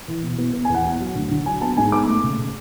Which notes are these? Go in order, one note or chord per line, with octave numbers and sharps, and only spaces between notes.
E3
B2
B3
B3
G#5
E2 F#5
B3
F#3
D2
D3
F#3 G#5
B3 A5
G#2 G#5
B3 D6
A3
C#3
C#3